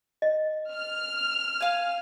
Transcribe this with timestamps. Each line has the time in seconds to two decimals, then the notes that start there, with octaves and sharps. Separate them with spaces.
0.22 D#5
0.72 F6
1.61 F5 G#5